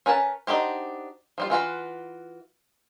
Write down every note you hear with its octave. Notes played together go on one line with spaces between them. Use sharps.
C#4 A#4 B4 G#5 A5
D4 D#4 F#4 G4 C5
F3 G3 F4
E3 F4 F#4 B4